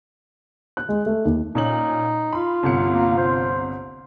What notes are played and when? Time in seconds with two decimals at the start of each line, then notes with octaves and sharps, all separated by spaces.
0.77 F#6
0.89 G#3
1.06 A3
1.25 D#2
1.55 A#2 C#4 D#4 F#7
2.33 F4 B5 C6
2.63 G1 C2 C#7
2.91 A#3
3.17 C5